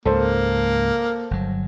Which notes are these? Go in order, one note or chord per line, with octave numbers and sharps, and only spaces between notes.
C#2 G#2 A#3 A4 C5
G1 F#3